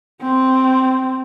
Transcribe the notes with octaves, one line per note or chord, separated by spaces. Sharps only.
C4